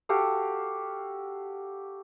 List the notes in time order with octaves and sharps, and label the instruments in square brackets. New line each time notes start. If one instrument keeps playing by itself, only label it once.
[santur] F#4 G4 A4 F5